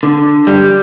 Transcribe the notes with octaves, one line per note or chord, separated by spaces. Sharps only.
D3
G3